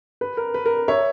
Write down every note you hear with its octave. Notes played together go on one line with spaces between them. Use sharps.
B4
A#4
B4
A#4
C#5 E5